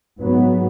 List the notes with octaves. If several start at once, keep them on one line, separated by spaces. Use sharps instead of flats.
G#2 F#3 B3